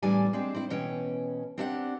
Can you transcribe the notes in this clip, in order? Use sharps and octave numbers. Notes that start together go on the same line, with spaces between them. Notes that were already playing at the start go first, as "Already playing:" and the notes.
E2 A2 G3 D4 D5 G#5
G#3 C4 D4 G4
C4 E4
B2 E3 C#4 G5
C4 D4 G4 D5 E5 F#5